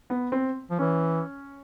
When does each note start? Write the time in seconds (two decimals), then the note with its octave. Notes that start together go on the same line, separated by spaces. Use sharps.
0.10 B3
0.32 C4
0.70 F3
0.79 E3 C#4